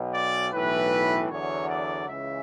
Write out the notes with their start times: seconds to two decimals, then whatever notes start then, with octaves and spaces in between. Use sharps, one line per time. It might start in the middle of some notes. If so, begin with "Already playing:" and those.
Already playing: B1 B2 F#3
0.12 D5
0.51 B1 A2 E3 B4
1.29 E2 D3 F#3 C#5
1.68 D5
2.07 C#2 C#3 E3 E5